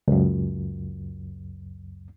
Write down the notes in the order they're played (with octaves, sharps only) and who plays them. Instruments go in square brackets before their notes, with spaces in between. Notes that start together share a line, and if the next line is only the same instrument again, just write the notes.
[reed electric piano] C#2 F#2